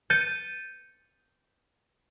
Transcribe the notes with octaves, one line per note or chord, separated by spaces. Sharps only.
G6 A6 C#7 D#7